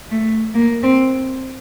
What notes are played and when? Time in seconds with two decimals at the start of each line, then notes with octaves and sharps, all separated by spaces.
0.11 A3
0.55 A#3
0.83 C4